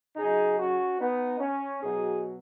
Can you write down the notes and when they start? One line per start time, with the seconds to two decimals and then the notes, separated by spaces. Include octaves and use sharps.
0.16 C#3 F#3 D#4 G#4
0.58 C#4 F#4
1.00 B3 D#4
1.40 C#4
1.82 B2 F#3 D#4 G#4